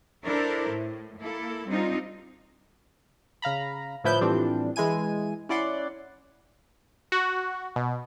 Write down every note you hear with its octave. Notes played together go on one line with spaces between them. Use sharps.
D4 E4 A4 A#4 C5 E5
A2
A#3 E4 A4
G3 C4 D4 D#4 F4
C#3 F5 A#5 B5
A2 D3 F3 E4 B4 G6
A2 E3 F3 G3 C4 D4
E3 G#3 E4 G#5 D#7
C#4 E4 D5 F#5 C6
F#4
B2